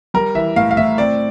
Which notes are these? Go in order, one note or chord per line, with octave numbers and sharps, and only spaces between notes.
G3 A#4
E3 E5
A2 F5
F5
A2 E5
C4 D5